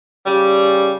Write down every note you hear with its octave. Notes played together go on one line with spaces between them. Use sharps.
C#3 G3